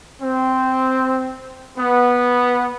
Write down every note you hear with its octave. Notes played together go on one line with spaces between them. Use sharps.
C4
B3